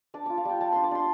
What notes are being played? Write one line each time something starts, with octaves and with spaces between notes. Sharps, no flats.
D4 D6
F4 D6
F5
G3 G5
G3 A5
D4 C6
D6
D4 C6